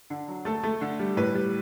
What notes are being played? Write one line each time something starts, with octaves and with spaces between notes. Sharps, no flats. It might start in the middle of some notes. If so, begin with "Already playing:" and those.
D3
F#3
A3 A4
A3
D3
G3
A2 B4
G3